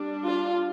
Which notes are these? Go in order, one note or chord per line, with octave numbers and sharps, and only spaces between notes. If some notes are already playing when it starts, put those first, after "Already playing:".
Already playing: G3 D4
F4